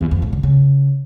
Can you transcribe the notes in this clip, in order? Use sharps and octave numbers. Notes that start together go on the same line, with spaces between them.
E2
F2
A2
D3
C#3